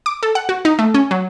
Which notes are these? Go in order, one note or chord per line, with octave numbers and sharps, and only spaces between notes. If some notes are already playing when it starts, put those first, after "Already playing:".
D6
A4
F#5
F#4
D#4
A3
C#4
F#3